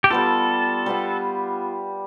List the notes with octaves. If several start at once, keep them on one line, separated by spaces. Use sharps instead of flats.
G4
G3 B3 F4 A4
G3 B3 F4